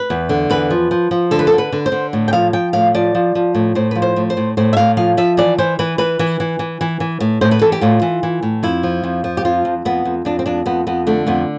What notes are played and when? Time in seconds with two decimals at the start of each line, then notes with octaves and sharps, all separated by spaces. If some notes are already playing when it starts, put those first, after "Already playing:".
Already playing: B4
0.10 E2
0.29 D3
0.50 E2 B4
0.70 F3
0.91 F3
1.11 F3
1.31 D3 A4
1.39 B4
1.47 A4
1.52 D3
1.58 B4
1.72 D3
1.86 C5
1.92 D3
2.13 A2
2.28 G5
2.33 F3 F5
2.53 F3 G5
2.73 A2 F5
2.94 F3 D5
3.15 F3
3.35 F3
3.55 A2
3.75 A2 C5
3.91 F3 B4
4.02 C5
4.16 A2
4.30 C5
4.37 A2
4.57 A2 C5
4.73 E5
4.77 A2 F5
4.97 F3 F5
5.17 F3 E5
5.37 E3 D5
5.58 E3 C5
5.79 E3 B4
5.98 E3 B4
6.19 E3
6.40 E3
6.59 E3
6.81 E3
7.00 E3
7.20 A2
7.41 A2 C5
7.51 B4
7.62 E3 A4
7.72 G4
7.81 A2 F4
8.02 E3
8.23 E3
8.43 A2
8.63 F2 E4
8.83 F3
9.04 F2
9.24 F3
9.37 G4
9.45 F2 F4
9.65 F2
9.85 F2 B3
10.05 F2
10.25 F2 D4
10.39 C4
10.46 F2 D4
10.66 F2 B3
10.87 F2 B3
11.07 D3 A3
11.27 F2 B3